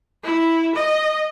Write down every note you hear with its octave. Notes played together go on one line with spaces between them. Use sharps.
E4
D#5